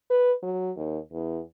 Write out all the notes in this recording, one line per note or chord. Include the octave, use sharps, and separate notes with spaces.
B4
F#3
D#2
E2